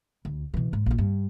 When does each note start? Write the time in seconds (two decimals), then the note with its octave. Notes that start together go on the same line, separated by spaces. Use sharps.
0.25 D2
0.54 B2 E3
0.73 G#2
0.86 A#1 F4
0.98 G2